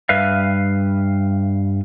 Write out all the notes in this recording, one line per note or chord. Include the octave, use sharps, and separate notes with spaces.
G2 B4 E5 F5